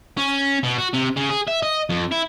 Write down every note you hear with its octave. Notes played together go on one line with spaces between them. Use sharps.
C#4
B2
F#4
C3
C#3
G#4
E5
D#5
F2
E4